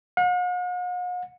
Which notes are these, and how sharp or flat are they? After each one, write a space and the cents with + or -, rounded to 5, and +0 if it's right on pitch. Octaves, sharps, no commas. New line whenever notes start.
F#5 -45